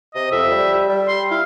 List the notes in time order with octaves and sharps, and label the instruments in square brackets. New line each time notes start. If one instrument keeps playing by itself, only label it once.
[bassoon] C3 [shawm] D#5
[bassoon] F2 [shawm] E5
[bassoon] G3
G3
[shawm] C6
[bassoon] E4 [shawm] F5